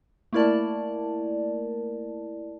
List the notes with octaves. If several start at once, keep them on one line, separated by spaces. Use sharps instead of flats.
A3 A#3 E4 A#4 D5 A5